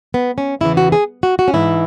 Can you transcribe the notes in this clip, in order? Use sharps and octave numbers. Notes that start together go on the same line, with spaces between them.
B3
C#4
E2 C#3 E3 E4
F#4
G#4
F#4
F#4
C#4
G#2 E3 E4